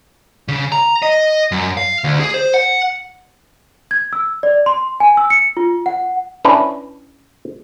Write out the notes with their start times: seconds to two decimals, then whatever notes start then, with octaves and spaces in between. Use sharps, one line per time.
0.48 C#3
0.72 A#5
1.02 D#5
1.52 F#2
1.77 F5
2.04 D2
2.20 G#4
2.34 C5
2.54 F#5
3.91 G#6
4.13 E6
4.43 D5
4.66 C6
5.00 G#5
5.17 E6
5.30 C#7
5.57 F4
5.86 F#5
6.45 C#4 D4 E4 B4